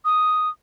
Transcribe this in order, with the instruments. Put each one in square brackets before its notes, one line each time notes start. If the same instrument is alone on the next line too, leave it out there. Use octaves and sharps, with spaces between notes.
[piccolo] D#6